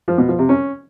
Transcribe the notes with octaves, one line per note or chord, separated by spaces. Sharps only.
F3
B2
F3
C3
C#4